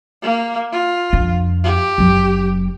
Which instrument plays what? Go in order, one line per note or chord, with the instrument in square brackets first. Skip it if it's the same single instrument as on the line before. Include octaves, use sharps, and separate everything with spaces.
[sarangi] A#3
F4
[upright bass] F2 D4
[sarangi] G4
[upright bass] F#1 F#3